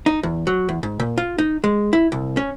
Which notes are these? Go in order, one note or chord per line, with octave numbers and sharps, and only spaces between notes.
D#4
E2
F#3
E2
G#2
A#2
F4
D#4
G#3
E4
C2
C#4